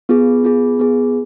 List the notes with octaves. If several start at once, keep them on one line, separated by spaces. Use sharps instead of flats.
B3 F4 G#4
B3 F4 G#4
B3 F4 G#4